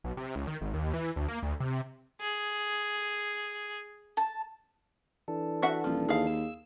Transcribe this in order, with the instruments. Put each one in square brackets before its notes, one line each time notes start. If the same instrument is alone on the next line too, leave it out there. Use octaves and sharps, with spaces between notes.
[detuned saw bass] B1
C3
C#2
D#3
G#1
D#2
E3
D2
A#3
D2
C3
[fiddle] G#4
[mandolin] A5
[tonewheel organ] E3 D4 A4
[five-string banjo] F#4 E5 F#5
[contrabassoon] D#1 [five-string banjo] F3
[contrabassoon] D#2 [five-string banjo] G#4 F5
[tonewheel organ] E6